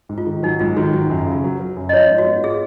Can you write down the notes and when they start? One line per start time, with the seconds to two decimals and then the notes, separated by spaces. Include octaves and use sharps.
0.09 G#2
0.18 F4
0.27 D#3
0.43 F#3 D#4
0.59 G#2 F4
0.77 D#3 F#4
0.93 F#3 F#4
1.10 F#2
1.27 C#3
1.44 F#3
1.60 F#3
1.77 F#2
1.89 D#5
1.93 F3 C#5
2.10 G#2
2.18 F#4
2.27 B3
2.44 F4 G#4